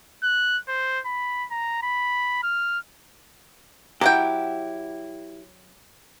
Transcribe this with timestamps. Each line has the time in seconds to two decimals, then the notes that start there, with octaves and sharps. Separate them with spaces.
0.23 F#6
0.68 C5
1.06 B5
1.51 A#5
1.83 B5
2.43 F6
4.01 F#3 E4 G4 F#5 G5